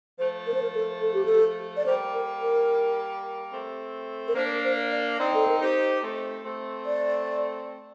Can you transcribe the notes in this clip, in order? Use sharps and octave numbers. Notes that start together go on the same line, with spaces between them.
F3 A3 C5
A#4
C5
A#4
A4
A4
G4
A4
D5
G3 A#3 C5
A#4
A#4
A3 C4
A#4
A#3 D4 C5
C5
D5
C4 D#4 D5
A4
A#4
D#4 G4 C5
A3 C4
A3 C4
D5